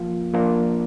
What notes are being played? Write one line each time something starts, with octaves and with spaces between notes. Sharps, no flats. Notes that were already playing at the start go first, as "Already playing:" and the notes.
Already playing: F3 A#3 F4
F3 A#3 D4 F4